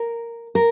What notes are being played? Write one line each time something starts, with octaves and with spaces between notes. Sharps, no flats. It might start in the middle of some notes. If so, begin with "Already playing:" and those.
Already playing: A#4
A#4